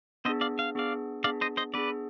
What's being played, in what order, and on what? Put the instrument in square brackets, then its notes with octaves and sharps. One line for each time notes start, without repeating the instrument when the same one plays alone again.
[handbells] B3 D4 G#4 [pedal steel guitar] C5 D#5
[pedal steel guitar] D5 F5
F5
[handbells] B3 D4 G#4 [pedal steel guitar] D5 F5
[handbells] B3 D4 G#4 [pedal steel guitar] D5 F5
[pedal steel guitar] C5 D#5
C5 D#5
[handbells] B3 D4 G#4 [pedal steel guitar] B4 D5